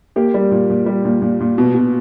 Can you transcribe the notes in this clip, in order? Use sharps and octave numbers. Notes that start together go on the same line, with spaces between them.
A#3 G4
G3
A#2
A#2
G3
A#2
A#2
A#2
B2
B2